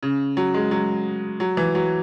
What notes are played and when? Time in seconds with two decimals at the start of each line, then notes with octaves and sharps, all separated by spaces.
0.03 C#3
0.37 F#3
0.54 G#3
0.71 F#3
1.40 F#3
1.57 E3
1.75 F#3